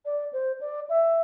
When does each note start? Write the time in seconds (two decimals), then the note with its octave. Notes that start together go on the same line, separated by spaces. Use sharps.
0.05 D5
0.33 C5
0.61 D5
0.90 E5